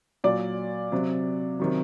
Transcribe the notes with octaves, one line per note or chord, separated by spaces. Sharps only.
A#2 F#3 D5
C3 F#3
C3 D#3 F#3